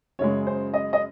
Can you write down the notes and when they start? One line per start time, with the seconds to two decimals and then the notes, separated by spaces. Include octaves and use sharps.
0.19 F#2 C#3 G#3 C#5
0.47 C5
0.74 D#5
0.93 D#5